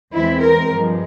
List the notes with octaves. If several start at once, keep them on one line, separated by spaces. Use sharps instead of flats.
E2 E3 G#3 C4 E4
A#4
G2 F3 G#3